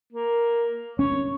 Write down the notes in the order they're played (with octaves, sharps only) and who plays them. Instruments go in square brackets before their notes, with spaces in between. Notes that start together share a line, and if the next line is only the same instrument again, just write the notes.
[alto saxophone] A#3
[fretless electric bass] C#4 [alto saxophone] C#5